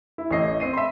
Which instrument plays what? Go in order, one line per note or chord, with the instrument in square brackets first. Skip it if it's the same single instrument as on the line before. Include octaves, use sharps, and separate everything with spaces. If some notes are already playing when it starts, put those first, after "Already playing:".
[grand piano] E4
[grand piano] A1 A3 C7 [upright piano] C#5 D#5
[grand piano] C4 C7 D#7
[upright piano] E5 C6 [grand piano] B5